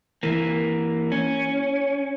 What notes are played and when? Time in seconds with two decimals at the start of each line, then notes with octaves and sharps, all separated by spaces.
0.23 E3 A#3
1.12 C#4